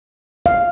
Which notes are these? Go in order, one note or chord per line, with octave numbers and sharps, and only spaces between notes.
F5